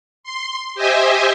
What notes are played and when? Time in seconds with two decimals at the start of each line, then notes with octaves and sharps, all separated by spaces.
0.24 C6
0.75 G4 C5 D#5 E5 G#5